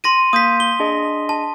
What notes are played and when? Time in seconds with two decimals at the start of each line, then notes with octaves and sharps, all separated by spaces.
0.04 C6 A#6 D#7
0.33 A#3 D#6 G6 B6
0.60 G7
0.80 D4 G#4 D#5
1.29 A5